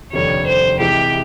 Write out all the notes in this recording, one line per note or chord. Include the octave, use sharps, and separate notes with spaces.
F1 D#2 D3 G3 C#5
C5
C3 E3 G#3 G4